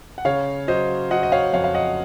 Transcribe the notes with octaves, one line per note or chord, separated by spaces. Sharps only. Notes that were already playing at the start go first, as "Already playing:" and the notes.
F#5
C#3 C#5 F5
F#3 C5 D#5
F#3 D#5 F#5
D#5
C#5 F5
F2 C#5 F5
F5
D#5 F#5